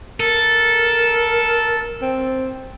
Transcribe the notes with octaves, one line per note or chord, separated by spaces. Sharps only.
A4 A#4
C4